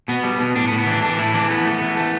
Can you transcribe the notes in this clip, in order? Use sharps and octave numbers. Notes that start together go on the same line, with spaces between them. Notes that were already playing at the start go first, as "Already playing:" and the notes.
B2 B3
G3
B2
A2 D4
B3
A2
B3
E3 D4
A2 D4
A3 E4
E3 D4
A3 B3
A3
E3
A3